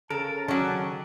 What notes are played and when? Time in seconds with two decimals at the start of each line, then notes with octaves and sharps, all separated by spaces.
0.10 C#3 A4 A#4 A5
0.48 D#3 F#3 C#4 D5